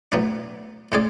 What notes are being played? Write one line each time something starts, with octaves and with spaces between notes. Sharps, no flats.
A2 F#3 B3 D4
A2 G#3 C#4 G#4 D5